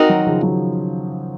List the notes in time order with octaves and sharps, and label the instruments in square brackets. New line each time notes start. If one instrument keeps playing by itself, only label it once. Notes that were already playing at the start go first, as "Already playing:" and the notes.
Already playing: [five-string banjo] C4 D#4 F#4 A#4 D#5
[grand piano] D#3 F#3
C#3 F3
D#3 F#3